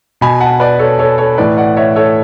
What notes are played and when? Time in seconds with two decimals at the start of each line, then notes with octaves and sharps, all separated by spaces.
0.21 B2 G#5 B5
0.40 F#5 A5
0.60 B4 D5
0.79 A4 C#5
0.99 A4 C#5
1.18 A4 C#5
1.38 A2 E3 B4 D5
1.57 D5 F#5
1.77 C#5 E5
1.96 A4 C#5